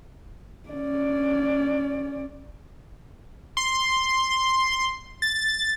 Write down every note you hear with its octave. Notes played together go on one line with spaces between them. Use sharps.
C#4 D5
C6
A6